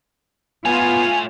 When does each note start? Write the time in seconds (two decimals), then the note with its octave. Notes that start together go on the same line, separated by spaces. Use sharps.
0.65 A3 B3 F4 C#5 G#5